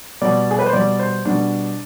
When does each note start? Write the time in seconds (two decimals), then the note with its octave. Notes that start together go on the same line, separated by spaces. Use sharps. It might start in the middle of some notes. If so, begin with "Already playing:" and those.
0.21 B2 G3 D5
0.51 G#4
0.59 B4
0.66 C5
0.73 B2 G3 D5
0.99 C5
1.25 B2 G3 D4